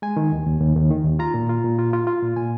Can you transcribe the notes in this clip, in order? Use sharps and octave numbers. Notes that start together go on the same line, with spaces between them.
G#3 G#5
D#3
D#2
D#2
D#2
D#2
D#3
D#2
F4 A#5
A#2
F4
A#2
F4
F4
F4
A#2
A#2 G#5